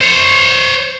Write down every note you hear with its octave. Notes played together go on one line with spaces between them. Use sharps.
C5 C#5